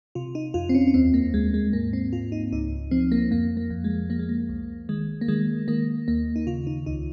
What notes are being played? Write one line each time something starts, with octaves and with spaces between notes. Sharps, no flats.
C3 F4
D#4
F2 F4
C4
C#4
C#4
D#2 C4
A#3
D#2 G#3
G#3
G#2 A#3
C4
G#2 F4
D#4
C#2 D#4
F3 C4
A#3
F2 A#3
A#3
F2
G#3
F3 A#3
G#3
A#3
C2
D#3 G#3
A#3
D#3 G#3
D#3 A#3
D#2 A#3
D#4
C#3 F4
D#4
C#2 D#4